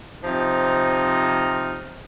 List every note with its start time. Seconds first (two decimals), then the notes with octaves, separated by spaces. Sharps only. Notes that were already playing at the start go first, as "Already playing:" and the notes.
0.23 C3 F3 D#4